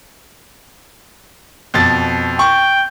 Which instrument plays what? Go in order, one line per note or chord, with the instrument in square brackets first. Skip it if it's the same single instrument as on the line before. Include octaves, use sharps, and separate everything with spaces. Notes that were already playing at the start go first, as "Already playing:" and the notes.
[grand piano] F2 B2 A6
[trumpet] G5 [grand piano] C#6